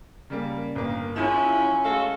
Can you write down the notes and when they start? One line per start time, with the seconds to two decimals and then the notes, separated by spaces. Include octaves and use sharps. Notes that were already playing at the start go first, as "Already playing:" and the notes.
0.30 C#3 G3 A#3
0.75 G1 A#3
1.16 F3 G#3 C#4 E4 E7
1.84 G#3 A3 F#4 A4 F5